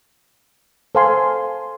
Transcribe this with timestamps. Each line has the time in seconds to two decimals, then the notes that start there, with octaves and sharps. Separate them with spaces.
0.95 A4 C5 F5 G#5 C6